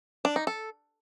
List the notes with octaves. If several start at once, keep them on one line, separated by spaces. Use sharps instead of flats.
D4
D#4
A4